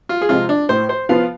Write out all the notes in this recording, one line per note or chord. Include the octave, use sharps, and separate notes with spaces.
F4
G#4
C3 F3 G#3 C4 F4
D4
A2 C5
C5
F3 B3 F4 F5